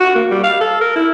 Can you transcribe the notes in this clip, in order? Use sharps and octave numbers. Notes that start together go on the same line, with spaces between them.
F#4
A#3
G3
F5
A4
A#4
E4